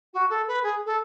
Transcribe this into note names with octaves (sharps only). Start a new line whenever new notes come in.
F#4
A4
B4
G#4
A4